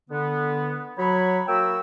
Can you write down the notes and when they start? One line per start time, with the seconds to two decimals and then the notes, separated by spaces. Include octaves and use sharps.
0.10 D3 B3
0.98 F#3 C#5 B5
1.48 A#3 F#4 G5 E6